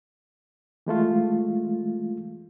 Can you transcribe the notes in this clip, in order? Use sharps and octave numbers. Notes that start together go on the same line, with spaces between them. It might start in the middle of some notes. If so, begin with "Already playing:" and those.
E3 G#3 A3 F4